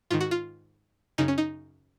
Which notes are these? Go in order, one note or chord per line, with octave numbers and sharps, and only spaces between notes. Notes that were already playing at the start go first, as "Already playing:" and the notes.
G#2 D#3 F4
F#4
F4
F#2 C#3 D#4
C#4
D#4